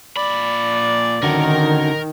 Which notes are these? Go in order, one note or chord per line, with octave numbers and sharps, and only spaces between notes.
A#2 D5 B5
D3 D#3 C#4 F#4 A#4